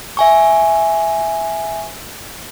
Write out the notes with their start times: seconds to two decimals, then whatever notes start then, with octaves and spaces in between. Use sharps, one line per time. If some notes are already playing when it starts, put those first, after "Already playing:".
0.17 E5 G#5 C#6